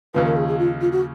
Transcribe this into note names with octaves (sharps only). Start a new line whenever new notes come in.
D#2 C#3 F3 B4
A#4
G#4
G#4
F4
F4
F#4